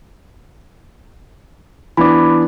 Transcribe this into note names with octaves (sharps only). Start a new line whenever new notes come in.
E3 B3 D4 B5 D6